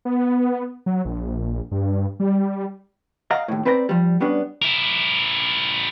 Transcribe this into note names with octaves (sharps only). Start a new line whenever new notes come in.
B3
F#3
A#1
G2
G3
D#5 F5 F#5 A#5
D#2 A2
C4 B4 C5 D5 G5 A#5
F3 G3
G3 B3 C#4 D4
E4 A#4